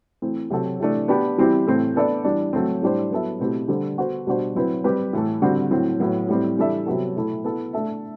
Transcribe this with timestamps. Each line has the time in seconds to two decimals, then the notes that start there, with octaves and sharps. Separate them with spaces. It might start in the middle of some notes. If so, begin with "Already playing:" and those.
0.22 E3 A3 C4
0.50 C3 F#3 C4 F#4 A4
0.80 C3 E3 A3 D4
1.08 B3 D4 G4
1.38 E3 G3 C4 E4 G4
1.67 A2 E3 A3 C4
1.96 B3 D4 A4 D5
2.25 E3 G3 D4
2.53 F#3 A3 C4
2.82 A2 G3 D4 G4 C5
3.11 F#3 B3 E4 A4 E5
3.39 B2 A3 C4 E4 G4
3.68 D3 G3 D4 A4 C5
3.97 B3 F#4 A4 C5
4.27 B2 G3 D4 F#4 C5
4.55 F#3 C4 E4 B4
4.84 G3 C4 G4 B4
5.13 A2 E3 A3
5.42 D3 G3 C4 F#4
5.71 A2 F#3 C4
6.00 A2 F#3 B3
6.28 A2 G3 C4
6.57 E3 G3 D4 A4 E5
6.86 C3 F#3 B3 F#4 A4
7.15 B2 A3 E4 A4
7.44 B3 E4 A4
7.73 A3 D4 A4 E5